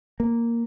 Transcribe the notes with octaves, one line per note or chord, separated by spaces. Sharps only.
A#3